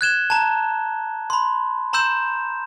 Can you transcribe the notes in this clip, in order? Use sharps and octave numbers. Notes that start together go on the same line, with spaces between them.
F#6 G#6 E7 G7
A5 A#5
B5 C6
A#5 C6 E6 G6 E7